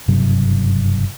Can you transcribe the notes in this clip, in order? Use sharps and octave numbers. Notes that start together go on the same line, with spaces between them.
F#1 G2 C3 F#3